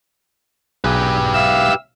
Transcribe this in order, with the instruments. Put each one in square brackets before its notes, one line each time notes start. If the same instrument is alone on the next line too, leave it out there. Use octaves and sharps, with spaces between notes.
[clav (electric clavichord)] B1 G#4 [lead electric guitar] G4 B4
[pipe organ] E5 F5 E6